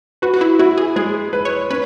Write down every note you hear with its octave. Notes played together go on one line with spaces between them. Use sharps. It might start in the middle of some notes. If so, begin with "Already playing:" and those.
F#4 B4
F#4
E4
E4 F#4
G#4
G#3 G#4
B4
C#5
C#4 B4